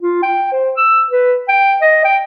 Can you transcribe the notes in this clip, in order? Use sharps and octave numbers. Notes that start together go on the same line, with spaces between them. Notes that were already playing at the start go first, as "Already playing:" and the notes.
F4
G5
C5
E6
B4
G5
D#5
G5